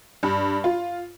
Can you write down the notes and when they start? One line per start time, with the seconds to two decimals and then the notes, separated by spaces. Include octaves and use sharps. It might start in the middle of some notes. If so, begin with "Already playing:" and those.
0.23 G2
0.64 F4